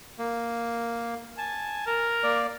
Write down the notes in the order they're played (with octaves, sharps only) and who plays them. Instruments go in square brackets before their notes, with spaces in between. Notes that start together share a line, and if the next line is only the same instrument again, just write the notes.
[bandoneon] A#3
[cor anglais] G#5 [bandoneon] A5
[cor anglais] A#4
[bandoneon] A#3 D5